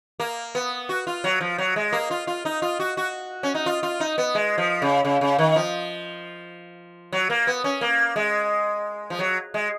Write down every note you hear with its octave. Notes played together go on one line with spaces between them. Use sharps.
A#3
B3
F#4
F4
F#3
F3
F#3
G#3
A#3
F4
F4
D#4
F4
F#4
F#4
C#4
D#4
F4
F4
D#4
B3
G#3
F3
C#3
C#3
C#3
D#3
F3
F#3
A#3
B3
C#4
A#3
G#3
F3
F#3
G#3